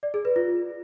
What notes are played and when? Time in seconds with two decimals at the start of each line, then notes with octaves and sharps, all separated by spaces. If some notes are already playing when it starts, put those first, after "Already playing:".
0.03 D5
0.14 G#4
0.25 B4
0.36 F4